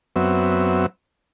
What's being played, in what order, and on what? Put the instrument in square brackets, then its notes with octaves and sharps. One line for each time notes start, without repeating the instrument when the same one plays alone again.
[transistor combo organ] F#2 F#3 B3 C4 E5